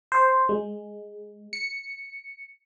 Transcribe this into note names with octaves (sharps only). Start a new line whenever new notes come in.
C5
G#3
C#7